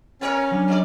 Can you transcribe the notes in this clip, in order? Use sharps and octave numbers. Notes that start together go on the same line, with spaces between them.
B3 C#4 A#4 C#5 F6 A6
F#3 D4 F6
G2 D5